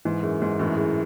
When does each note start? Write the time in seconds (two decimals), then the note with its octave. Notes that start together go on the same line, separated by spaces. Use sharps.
0.05 G#2 E3
0.23 F#2 G#4
0.42 G#2 G#3
0.59 F#2 A2 E3
0.78 G#4